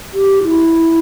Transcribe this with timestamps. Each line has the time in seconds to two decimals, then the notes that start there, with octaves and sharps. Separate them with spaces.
0.14 G4
0.44 E4